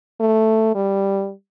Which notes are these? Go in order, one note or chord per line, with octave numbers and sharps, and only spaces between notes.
A3
G3